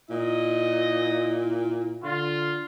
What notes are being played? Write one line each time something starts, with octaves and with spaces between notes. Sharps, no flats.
A#2 D#4 E4 D#5
D3 F4